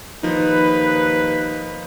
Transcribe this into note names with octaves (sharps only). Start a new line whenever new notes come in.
D#2 F3 D#4 B4